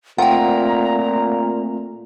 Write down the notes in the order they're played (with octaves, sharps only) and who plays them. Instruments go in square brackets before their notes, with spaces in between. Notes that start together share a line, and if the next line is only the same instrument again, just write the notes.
[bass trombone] A#2 [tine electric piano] A3 C4 F4 [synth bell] F#5 G5 [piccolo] A#5